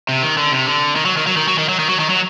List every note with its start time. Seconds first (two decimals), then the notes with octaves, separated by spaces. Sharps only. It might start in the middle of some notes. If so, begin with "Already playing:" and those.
0.09 C3
0.23 D#3
0.38 D3
0.52 C3
0.67 D3
0.96 D#3
1.05 F#3
1.17 D#3
1.27 F#3
1.37 D#3
1.48 F#3
1.58 D#3
1.69 F#3
1.79 D#3
1.89 F#3
2.00 D#3
2.10 F#3